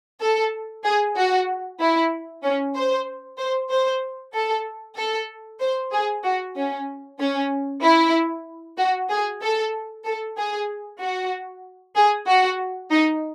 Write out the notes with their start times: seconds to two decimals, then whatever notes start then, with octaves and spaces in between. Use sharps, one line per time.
0.21 A4
0.84 G#4
1.17 F#4
1.80 E4
2.43 C#4
2.75 C5
3.39 C5
3.71 C5
4.34 A4
4.97 A4
5.60 C5
5.92 G#4
6.24 F#4
6.56 C#4
7.20 C#4
7.82 E4
8.78 F#4
9.10 G#4
9.42 A4
10.05 A4
10.38 G#4
11.00 F#4
11.96 G#4
12.28 F#4
12.91 D#4